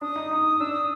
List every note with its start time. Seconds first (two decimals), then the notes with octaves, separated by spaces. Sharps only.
0.01 D4 D#6
0.16 D#4
0.31 D#4
0.60 D4 E6
0.73 D#6